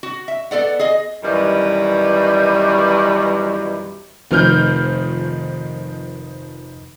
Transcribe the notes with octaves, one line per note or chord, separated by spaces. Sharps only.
F#4
E5
B3 A4 D5 F#5
G#4 D#5
F#2 B2 D#3 E3 G3
F1 D#3 F3 F6 G6